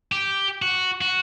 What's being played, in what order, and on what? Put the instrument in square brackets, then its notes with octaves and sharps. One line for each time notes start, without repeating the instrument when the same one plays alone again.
[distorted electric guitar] G4
F#4
F#4